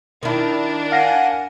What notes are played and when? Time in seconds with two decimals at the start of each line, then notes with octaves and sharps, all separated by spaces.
0.23 D#3 D4 E4 A#4
0.92 F5 F#5 G#5 A#6